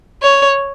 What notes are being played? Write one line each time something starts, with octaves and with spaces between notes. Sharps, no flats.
C#5